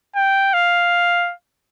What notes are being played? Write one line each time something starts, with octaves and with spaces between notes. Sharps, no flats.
G5
F5